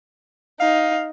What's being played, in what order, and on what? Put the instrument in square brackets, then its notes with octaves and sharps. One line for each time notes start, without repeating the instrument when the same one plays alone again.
[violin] D#4 [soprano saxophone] F5